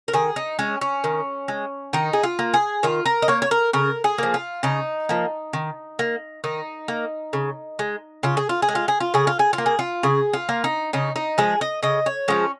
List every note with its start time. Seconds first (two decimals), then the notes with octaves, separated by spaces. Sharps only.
0.08 A#4
0.13 D#3 G#4
0.36 D#4
0.59 G#3 C#4
0.81 C#4
1.04 D#3
1.48 G#3
1.93 D#3 D#4
2.13 G#4
2.23 F4
2.39 A#3
2.54 G#4
2.83 D#3 F4
3.06 A#4
3.22 D#5
3.28 A#3 C#5
3.42 C#5
3.51 A#4
3.73 C#3 A#4
4.04 G#4
4.18 F3 A#3
4.34 F4
4.63 C#3 D#4
5.09 F3 A#3
5.53 D#3
5.99 A#3
6.44 D#3 D#4
6.88 A#3
7.33 C#3
7.79 G#3
8.23 C#3 F4
8.37 G#4
8.49 F4
8.62 G#4
8.69 G#3
8.75 F4
8.88 G#4
9.00 F4
9.14 C#3 G#4
9.27 F4
9.39 G#4
9.53 F4
9.58 A#3
9.66 G#4
9.79 F4
10.03 C#3 G#4
10.33 F4
10.49 A#3
10.64 D#4
10.93 C#3 D#4
11.16 D#4
11.38 F3 G#3 G#4
11.61 D#5
11.83 C#3 D#5
12.06 C#5
12.28 F3 G#3 C#4